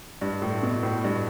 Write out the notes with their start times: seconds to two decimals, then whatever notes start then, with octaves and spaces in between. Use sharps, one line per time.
0.21 G2
0.42 A2
0.63 B2
0.83 A2
1.04 G2